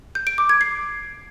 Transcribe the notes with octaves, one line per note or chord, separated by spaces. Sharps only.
G6
D7
D6
G#6
C7